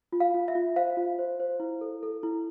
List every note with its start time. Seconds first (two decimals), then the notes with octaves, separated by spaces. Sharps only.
0.12 F4
0.20 F5
0.34 F4
0.48 E5
0.55 F4
0.76 C5 F5
0.97 F4
1.19 C5
1.40 C5
1.60 E4
1.81 A4
2.03 A4
2.23 E4